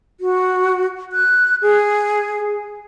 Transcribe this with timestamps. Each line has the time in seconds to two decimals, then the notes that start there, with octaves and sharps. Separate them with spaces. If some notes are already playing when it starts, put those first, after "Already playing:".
0.20 F#4
1.13 F#6
1.62 G#4